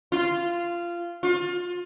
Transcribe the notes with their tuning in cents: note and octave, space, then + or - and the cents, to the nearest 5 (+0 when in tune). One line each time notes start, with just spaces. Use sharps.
F4 -15
F4 +25